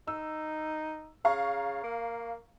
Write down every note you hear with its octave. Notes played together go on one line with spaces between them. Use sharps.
D#4 E6
C#3 F5 A#5 C#6
A#3